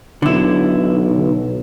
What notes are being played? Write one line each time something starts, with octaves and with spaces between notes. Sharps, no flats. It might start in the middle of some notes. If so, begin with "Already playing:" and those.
B1 D3 E4